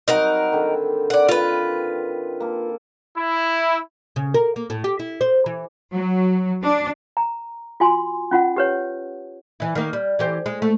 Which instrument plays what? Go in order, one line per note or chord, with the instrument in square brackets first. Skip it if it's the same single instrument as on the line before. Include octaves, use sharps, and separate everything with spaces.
[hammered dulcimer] F#3 G3 C4 [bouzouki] D#4 A#4 F#5
[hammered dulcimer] D3 D#3 G4
[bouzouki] D5 F#5
F4 B4
[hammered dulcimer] A#3 A4
[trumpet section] E4
[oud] C#3
A#4
A#3
A2
G4
E4
C5
E3
[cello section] F#3
D4
[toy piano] A#5
F4 F#4 G#5 C6
C#4 F4 F#5
G4 B4 C#5
[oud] E3 E4
D#3 A#3
G3
E3 G4 C5
G#3
A3